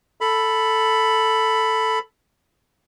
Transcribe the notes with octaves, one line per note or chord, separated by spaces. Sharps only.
A4 B5